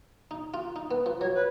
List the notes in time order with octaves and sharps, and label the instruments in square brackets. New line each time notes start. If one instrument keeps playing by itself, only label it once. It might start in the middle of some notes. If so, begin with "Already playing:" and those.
[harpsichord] D#4
F4
D#4
B3
F3
[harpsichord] F#3 [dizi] C#5
[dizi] B4